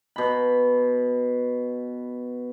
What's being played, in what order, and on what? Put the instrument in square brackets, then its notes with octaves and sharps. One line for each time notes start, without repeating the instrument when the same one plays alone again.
[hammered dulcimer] B2 B5